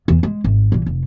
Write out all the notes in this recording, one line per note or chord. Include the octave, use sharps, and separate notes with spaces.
E2 E3
G#3
G#1
A#1 E3
F1